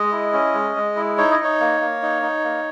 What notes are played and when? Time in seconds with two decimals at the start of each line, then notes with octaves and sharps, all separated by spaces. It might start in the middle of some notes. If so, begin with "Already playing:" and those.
Already playing: G#3 D#5
0.12 E4
0.33 C#4
0.54 G#3
0.76 G#3
0.96 E4
1.18 D#4 C#5
1.31 D#5
1.39 D#4 C#5
1.60 A#3
1.81 A#3
2.02 D#4
2.23 D#4
2.44 A#3